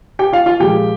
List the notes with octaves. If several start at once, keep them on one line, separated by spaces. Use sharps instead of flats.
G4 G5
F4 F5
F4 F5
A#2 F3 G#3 G4 G5